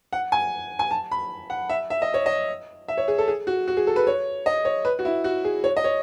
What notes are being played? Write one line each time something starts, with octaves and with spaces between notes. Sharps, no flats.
F#5
G#5
G#5
A5
B5
F#5
E5
E5
D#5
C#5
D#5
E5
C#5
G#4
A4
G#4
F#4
F#4
G#4
A4
B4
C#5
D#5
C#5
B4
F#4
E4
F#4
G#4
C#5
D#5
C#5